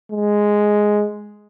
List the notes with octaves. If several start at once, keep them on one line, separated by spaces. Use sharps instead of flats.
G#3